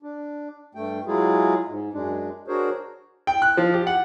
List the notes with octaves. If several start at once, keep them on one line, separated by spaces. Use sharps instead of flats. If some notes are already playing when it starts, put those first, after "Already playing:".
D4
G2 A3 G5
F#3 G#3 E4 F4 G#4
G#2
F#2 G#3 D4
D4 F#4 G#4 A#4 C5 C#5
G5
F#6
F3
G4
F#5